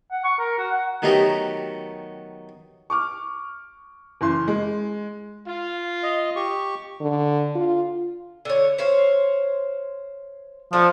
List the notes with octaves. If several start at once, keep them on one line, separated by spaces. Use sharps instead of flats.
F#5
C#6
A#4
F#4
F#5
D#3 F#3 A3 B3 G4 A#4
C#6 D6 F6
F#1 E3 C6
G#3
F4
D#5
G4 C#6
D3
F4
D3 C#5
C5 C#5 F5
F3 A3 D4